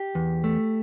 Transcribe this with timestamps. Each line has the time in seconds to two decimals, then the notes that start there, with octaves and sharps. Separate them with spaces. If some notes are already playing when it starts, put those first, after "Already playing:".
Already playing: G4
0.15 E2
0.44 A3